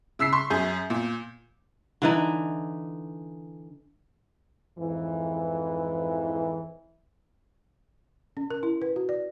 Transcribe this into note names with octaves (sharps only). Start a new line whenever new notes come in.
C#3 E6 B6 C7
C6 C#6
F#2 G#4 G6
A#2
D3 E3 D#4
F2 G#2 E3
C#4
A#4
E4
B4
F#4
D5